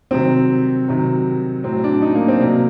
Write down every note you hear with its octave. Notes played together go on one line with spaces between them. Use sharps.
C3 D#3 F#3 C4
C3 D#3 F#3
A2 F#3 C4
D4
D#4
A#3
C4
C3 F#3 A#3